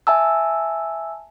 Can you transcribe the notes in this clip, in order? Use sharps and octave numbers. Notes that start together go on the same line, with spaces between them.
E5 G#5 A5 E6